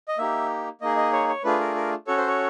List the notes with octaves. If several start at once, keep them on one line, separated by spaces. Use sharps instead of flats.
D#5
A#3 D#4 G4 E5
A#3 D#4 G#4 D#5
D#5
C#5
C#5
A3 D4 F4 G#4 B4
A#4
A#4
C#4 F#4 A4 C#5
C5
C#5